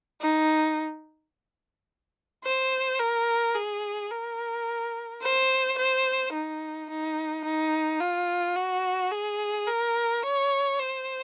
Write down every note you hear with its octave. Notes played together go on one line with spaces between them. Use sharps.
D#4
C5
A#4
G#4
A#4
C5
C5
D#4
D#4
D#4
F4
F#4
G#4
A#4
C#5
C5